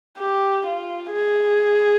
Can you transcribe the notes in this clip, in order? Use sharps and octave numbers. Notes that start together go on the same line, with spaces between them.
G4
F4
G#4